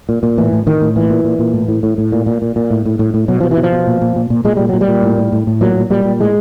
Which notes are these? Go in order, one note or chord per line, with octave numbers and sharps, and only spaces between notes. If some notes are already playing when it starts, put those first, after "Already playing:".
A#2
A#2
A2 E3
A2
A2 D#3
A2
A#2 E3
A#2
A#2
A#2
A2
A2
A2
A2
A#2
A#2
A#2
A#2
A2
A2
A2
A2
B2 F#3
B2 F3
E3
B2
F3
B2
A#2
A#2
A#2
A#2
A#2 G#3
A#2 G3
A#2 F#3
G3
A#2
A2
A2
A2
A2
A#2 F#3
A#2
A#2 G3
A#2
A2 G#3